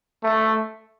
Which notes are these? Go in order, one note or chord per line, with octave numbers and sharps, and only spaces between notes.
A3